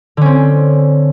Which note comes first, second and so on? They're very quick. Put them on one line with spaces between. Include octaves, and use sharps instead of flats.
D3 C#4 C4